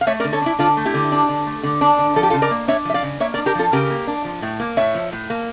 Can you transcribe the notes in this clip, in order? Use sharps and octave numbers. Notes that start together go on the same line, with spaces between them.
F5
A3 C#5 E5
A#4 D5
D3
A4 C#5
D4 E4
D3 D4 F4
A3
E4 G4
D3
D4
D3
A3
D3
D4
D3
F3 A4
G4
F4 A4
C#3
A#4 D5
A#3
D4 C#5 E5
F3 E5
D5 F5
C#3
A#3 C#5 E5
A#4 D5
D4
G4 A#4
F3 F4 A4
C#3 G4 A#4
A#3
D4
F3
A2
A#3
A2 C#5 E5
F3
A2
A#3